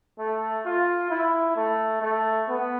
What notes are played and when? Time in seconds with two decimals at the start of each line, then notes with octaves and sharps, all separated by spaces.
0.19 A3
0.65 F4
1.10 E4
1.56 A3
2.02 A3
2.49 B3